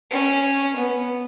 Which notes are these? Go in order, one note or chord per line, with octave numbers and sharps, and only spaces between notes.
C#4
B3